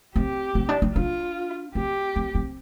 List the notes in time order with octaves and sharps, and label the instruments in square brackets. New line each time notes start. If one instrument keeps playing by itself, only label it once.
[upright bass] C4 [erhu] G4
[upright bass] C4
D4
D4
[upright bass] D4 [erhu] F4
[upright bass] C4 [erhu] G4
[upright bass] C4
C4